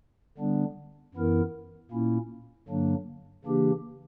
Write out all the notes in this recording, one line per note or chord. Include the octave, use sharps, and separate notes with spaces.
D3 G3 B3 D4
F#2 E3 B3 E4 A#4
A#2 A#3 C#4 E4
G2 D3 F#3 A#3 D4
C#3 E3 A#3 D4 G4